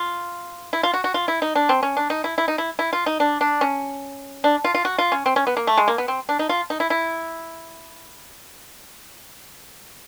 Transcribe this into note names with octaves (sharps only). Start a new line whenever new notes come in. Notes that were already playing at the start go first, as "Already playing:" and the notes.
Already playing: F4
E4
F4
F#4
F#4
F4
E4
D#4
D4
C4
C#4
D4
D#4
E4
E4
D#4
E4
E4
F4
D#4
D4
D4
C#4
D4
F4
F4
F#4
F4
C#4
C4
C#4
B3
A#3
A3
G#3
A#3
B3
C4
D4
D#4
F4
D#4
E4
E4